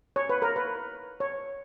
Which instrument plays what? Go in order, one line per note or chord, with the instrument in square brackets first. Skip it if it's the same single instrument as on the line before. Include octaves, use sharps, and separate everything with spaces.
[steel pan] C#5
B4
A#4
B4
C#5